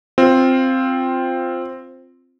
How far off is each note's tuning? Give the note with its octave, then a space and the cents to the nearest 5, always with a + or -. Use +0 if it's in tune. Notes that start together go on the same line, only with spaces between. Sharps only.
C4 +0 F4 +0